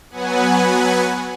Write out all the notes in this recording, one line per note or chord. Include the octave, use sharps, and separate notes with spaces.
F#3 B3 B4 F#5 G#5